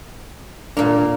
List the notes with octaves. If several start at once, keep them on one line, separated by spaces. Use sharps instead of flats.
A#2 A#3 D4 F5